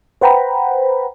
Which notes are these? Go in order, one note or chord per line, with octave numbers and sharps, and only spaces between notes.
B4 C5 F#5 G5 A#5 B5